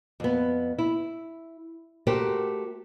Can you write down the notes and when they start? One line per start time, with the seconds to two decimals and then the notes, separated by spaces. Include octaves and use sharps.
0.20 F2 B3
0.78 E4
2.07 A3 F#4 G4 A#4 C5